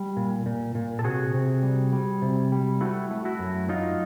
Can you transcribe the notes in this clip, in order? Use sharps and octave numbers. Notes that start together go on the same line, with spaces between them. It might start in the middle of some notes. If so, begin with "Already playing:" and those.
Already playing: G3
A#2
A#2
A#2
A4
C3 F#4 G#4
C3
G3
G3
C3
G3
A3 E4 F#4
A3
E4 F#4
F#2
F#3 D#4 F4